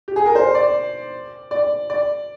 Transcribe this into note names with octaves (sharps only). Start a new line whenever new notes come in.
G4
G#4
A#4
C5
D5
D5
D5